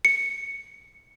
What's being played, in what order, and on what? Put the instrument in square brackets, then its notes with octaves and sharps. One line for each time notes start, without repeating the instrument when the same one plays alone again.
[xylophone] C#7